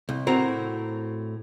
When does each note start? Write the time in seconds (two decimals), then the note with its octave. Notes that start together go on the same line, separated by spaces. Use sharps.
0.09 C2
0.27 A2 C4 F#4 A#4 A#5